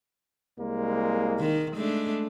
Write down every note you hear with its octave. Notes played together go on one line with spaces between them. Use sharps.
C2 G#3 A#3
D#3
G#3 A3 D4